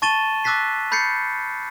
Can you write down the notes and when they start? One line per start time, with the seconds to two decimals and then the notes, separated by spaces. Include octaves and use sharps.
0.02 A5 C#6 A6 D#7 E7 G7
0.44 D6 E6 F#6 A6 B6 C7
0.92 B5 G6 A6 C7 C#7